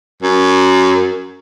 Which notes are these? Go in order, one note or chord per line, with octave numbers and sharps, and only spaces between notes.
F#2